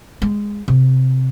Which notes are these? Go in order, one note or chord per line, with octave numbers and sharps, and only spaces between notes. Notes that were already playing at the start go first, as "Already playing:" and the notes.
G#3
C3